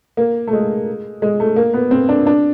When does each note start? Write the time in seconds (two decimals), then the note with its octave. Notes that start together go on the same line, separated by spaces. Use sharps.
0.17 A#3
0.47 A3
0.53 G#3
1.22 G#3
1.40 A3
1.56 A#3
1.74 B3
1.91 C4
2.09 D4
2.27 D4